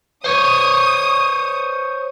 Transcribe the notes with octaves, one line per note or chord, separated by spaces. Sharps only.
C5 C#5 D#6